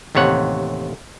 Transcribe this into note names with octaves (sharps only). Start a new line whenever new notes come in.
A1 D#2 C3 C#5 F#5